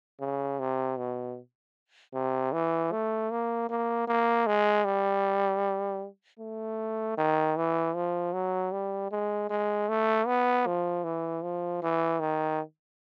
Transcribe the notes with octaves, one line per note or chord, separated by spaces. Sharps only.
C#3
C3
B2
C3
E3
A3
A#3
A#3
A#3
G#3
G3
A3
D#3
E3
F3
F#3
G3
G#3
G#3
A3
B3
F3
E3
F3
E3
D#3